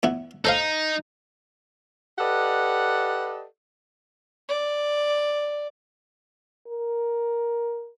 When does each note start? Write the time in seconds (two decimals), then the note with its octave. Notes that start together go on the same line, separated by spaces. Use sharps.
0.03 E2 B3 E4
0.45 D#4 A4 C5 F5
2.18 G4 A4 B4 D5 D#5 F#5
4.49 D5
6.67 A#4